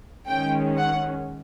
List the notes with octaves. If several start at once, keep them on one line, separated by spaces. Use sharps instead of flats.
D#3 G#3 C#4 G5
F#5